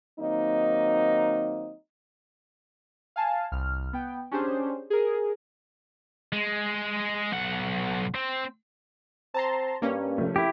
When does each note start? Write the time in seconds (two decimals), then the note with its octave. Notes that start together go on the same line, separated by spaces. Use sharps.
0.20 D#3 F#3 A#3 C4 D#4
3.16 F5 G#5 A5
3.52 C2 F6
3.93 B3 G5
4.31 C#4 D4 G4 G#4 C5
4.90 G#4 A#4
6.33 G#3
7.32 B1 F#5
8.15 C4
9.34 C4 A5 A#5 C6
9.82 G2 A#3 C#4
10.18 C3 F3 A3
10.36 E4 G4